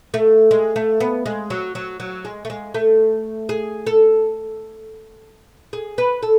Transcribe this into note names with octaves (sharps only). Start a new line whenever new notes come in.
A3
G#3
A3
B3
G#3
F#3
F#3
F#3
G#3
A3
G#3
A3
G#4
A4
G#4
B4
A4